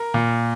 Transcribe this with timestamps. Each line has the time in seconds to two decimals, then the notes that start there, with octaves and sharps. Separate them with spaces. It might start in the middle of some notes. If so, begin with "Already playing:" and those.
Already playing: A#4
0.14 A#2